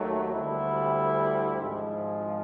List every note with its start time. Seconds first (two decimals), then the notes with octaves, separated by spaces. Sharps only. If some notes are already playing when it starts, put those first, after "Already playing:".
Already playing: D#2 D#3 F#3 A3
0.32 D2 D3 G3 C4 E4
1.62 G#1 G#2 F3 G#3